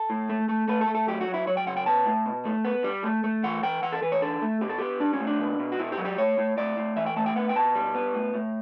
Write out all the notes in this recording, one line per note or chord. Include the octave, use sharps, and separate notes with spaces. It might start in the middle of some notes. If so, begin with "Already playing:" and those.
Already playing: A4
A2
A3
A3
A3 B4
A4
A3
A4
F#3 G4
F#4
F#3
E4
F#3 C#5
G5
C#3 F#5
G5
B3 A5
A2
B2
A3
B3
G3
A3
A3
E3 F#5
E3 G5
E3 F#5
A4
E3 B4
C#5
D3 A4
A3
B2 G4
A4
B3 G4
G3 D4
C#4
A2
D4
B2
B2
F#4
B2 E4
G4
F#3
G4
A2 C#5
A2
A2 D5
A2
E3 E5
G5
A3 A5
G5
B3 F#5
G5
B2 A5
G3
B3
A2
A2